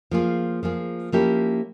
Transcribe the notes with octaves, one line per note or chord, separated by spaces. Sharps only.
F3 A#3 F4 G#4
F3 A#3 F4 G#4
F3 A#3 C#4 E4 G4